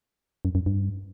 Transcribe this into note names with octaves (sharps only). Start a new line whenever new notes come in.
F#2
F#2
G2